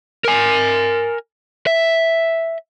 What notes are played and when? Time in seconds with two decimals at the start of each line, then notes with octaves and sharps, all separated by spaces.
0.25 A#4 G#5
1.67 E5